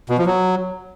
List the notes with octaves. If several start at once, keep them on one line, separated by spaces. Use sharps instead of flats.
B2
F3
F#3